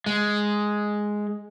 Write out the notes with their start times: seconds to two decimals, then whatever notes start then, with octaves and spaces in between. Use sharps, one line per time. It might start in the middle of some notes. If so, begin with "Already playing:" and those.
0.06 G#3